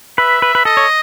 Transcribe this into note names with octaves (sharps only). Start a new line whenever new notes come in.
B4 E5
B4
B4
A4 D#5
C#5